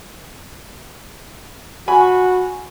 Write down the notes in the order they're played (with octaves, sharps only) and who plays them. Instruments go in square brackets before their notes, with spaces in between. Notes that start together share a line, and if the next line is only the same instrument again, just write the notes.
[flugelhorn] F#4 [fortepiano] G#5 B5